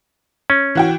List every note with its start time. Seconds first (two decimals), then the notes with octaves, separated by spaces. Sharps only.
0.50 C#4
0.75 E3 F#4 G5